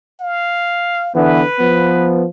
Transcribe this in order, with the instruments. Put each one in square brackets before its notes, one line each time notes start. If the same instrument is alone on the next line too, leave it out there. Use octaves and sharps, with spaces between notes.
[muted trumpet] F5
[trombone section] D3 E3 B3 [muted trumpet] B4
[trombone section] F3 B3